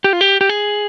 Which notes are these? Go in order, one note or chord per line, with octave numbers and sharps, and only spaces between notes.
G4
F4
G4
G4
G#4